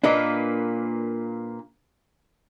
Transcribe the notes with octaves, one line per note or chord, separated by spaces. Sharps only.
A#2 A#3 D4 B4 D#5